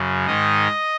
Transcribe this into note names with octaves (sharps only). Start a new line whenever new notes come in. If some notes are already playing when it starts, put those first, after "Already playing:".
Already playing: F#2 C#3
G#2 D#3 D#5